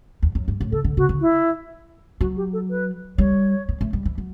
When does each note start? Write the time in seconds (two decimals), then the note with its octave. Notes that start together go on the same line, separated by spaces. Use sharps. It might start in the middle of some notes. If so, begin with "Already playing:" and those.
0.22 E2
0.35 F#2
0.48 G2
0.61 A2
0.72 C#3 A4
0.84 D3
0.97 C#3 F#4
1.09 D3
1.21 E4
2.20 F#3 F#4
2.37 G4
2.53 A4
2.70 B4
3.18 G3 C#5
3.69 B3
3.81 A3
3.93 G3
4.05 E3
4.18 F#3